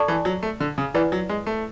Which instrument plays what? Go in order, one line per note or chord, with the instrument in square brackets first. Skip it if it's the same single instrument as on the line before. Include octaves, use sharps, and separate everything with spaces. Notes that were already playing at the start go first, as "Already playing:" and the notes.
Already playing: [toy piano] A4 D5 A5 C#6
[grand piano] E3
F#3
A3
D3
C#3
[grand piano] E3 [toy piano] E4 B4 D5 F#5
[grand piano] F#3
G#3
A3